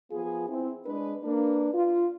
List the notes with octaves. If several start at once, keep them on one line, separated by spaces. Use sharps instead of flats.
F3 B3 F4 G#4
C4 E4
G#3 D4 B4
A#3 D4 B4
F4